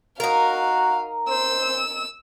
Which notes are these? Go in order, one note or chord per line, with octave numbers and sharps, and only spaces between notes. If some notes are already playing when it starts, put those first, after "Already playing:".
D#4 F#4 A#4 F5
C5 E6